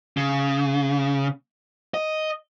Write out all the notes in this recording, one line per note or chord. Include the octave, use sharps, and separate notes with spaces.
C#3
D#5